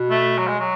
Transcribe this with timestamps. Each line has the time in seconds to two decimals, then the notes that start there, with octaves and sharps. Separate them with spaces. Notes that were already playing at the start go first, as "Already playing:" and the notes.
Already playing: B2
0.10 A3
0.38 F#3
0.48 G#3
0.59 F#3